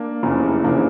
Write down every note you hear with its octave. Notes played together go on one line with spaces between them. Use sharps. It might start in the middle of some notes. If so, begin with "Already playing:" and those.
Already playing: A#3 D4
F1 E2 C#3 E3
F1 C#3 E3 A#3 D4